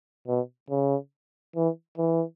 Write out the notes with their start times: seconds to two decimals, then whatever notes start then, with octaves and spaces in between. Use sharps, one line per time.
0.28 B2
0.70 C#3
1.56 E3
1.98 E3